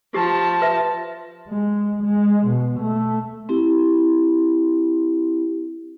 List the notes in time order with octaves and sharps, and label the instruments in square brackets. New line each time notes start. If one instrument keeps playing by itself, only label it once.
[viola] F3 A5 [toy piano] G4
[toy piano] B4 E5
[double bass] G#3
G#3
B2
A3
[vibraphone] C4 E4 G4